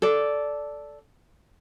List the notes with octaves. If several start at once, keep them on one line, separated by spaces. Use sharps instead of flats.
A4 D5